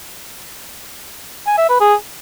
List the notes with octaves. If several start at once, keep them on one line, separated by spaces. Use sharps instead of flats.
G#5
E5
B4
G#4